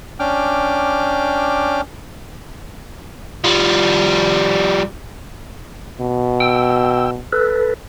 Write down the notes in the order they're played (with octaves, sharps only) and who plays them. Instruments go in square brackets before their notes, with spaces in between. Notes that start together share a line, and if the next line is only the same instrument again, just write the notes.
[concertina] C#4 D4 G5 D6 F6
[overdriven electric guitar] F3 G3
[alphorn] B2
[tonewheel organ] G5 E6
A4 B4